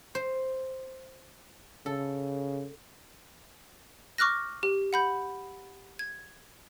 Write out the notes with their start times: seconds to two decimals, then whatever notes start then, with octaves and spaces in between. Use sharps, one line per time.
0.15 C5
1.86 C#3 A4
4.18 C#6 D6 F6 F#6 A#6
4.63 G4
4.93 F#5 B5 G6
5.99 G#6